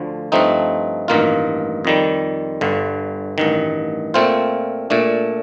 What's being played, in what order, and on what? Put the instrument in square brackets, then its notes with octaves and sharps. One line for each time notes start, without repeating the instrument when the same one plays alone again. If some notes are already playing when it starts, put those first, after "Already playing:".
Already playing: [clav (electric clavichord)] D2 D3 F3
G2 F3 A3 C4 D#4
A1 G2 D#3 A#3 F4
F2 D#3 G3
G1 G2 D3
A1 G2 D#3
A#2 A3 C4 F4 C5
A#2 A3 D4